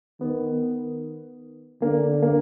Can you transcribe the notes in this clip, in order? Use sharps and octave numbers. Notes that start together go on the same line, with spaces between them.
D#3 B3
D3 A#3
A#3